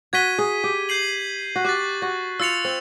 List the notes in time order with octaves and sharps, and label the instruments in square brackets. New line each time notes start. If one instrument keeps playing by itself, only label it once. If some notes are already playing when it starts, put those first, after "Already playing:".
[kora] F#4 [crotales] G#6 B6 D#7 G7
[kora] G#4
G4
[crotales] G6 C7 D#7 F#7
[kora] F#4
[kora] G4 [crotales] C#6 F#6 A6
[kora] F#4
[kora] F4 [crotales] E6 A6 C#7 F7
[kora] C4